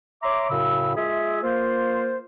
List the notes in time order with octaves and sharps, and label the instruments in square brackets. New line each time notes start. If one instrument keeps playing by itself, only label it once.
[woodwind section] C#5 E5 A#5 C6 D6
F#2 A2 C#3 B5 E6
G#3 F4 G#4 E5
A#3 F4 C5